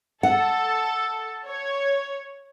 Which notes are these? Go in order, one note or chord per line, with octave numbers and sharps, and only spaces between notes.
A4 F#5
C#5